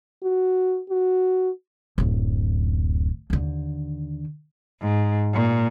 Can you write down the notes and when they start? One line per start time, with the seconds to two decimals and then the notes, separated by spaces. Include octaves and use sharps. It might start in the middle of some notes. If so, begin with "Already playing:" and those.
0.24 F#4
0.90 F#4
1.98 D1 F#2
3.30 D#2 D3
4.80 G#2
5.33 A#2